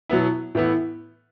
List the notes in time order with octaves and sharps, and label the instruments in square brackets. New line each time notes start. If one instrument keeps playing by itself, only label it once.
[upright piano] B2 F#3 B3 E4
A2 E3 B3 E4